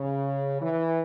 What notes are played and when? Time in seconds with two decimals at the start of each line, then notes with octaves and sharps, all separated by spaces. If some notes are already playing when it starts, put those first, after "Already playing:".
Already playing: C#3
0.61 E3